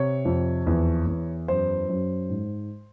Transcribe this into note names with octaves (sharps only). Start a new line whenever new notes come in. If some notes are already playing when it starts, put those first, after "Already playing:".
Already playing: C3 C#5
F2
E2
E2
F#2 C5
F#2
G#2